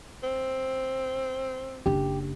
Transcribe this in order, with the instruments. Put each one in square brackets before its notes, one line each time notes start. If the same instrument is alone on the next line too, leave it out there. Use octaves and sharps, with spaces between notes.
[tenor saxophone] C4
[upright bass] F#1 D4 [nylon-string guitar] G4